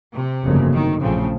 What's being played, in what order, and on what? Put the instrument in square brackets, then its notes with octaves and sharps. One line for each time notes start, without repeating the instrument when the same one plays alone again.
[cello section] C3
[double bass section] G1 F2 C#3 F#3 A#3
[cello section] D#3
[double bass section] A#1 A2 F3 A3 C4 [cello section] C#3